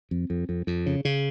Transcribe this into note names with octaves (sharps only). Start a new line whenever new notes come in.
F2
F2
F2
F2
C#3
C#3